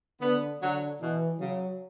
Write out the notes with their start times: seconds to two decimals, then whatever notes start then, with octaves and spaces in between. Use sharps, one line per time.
0.21 D3 B3
0.61 D3 F#3
1.01 B2 E3
1.39 C#3 F#3